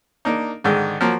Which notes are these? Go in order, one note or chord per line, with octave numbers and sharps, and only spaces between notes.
A#3 D4 D#4
G#2 D3 D#3 G#3
F3 F#3 A#3